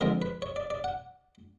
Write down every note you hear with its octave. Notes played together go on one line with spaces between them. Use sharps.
D3 F3 G#3 C4 A#4
B4
C#5
D5
D5
F#5